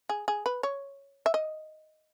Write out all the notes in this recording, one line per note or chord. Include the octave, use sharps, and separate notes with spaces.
G#4
G#4
B4
C#5
E5
D#5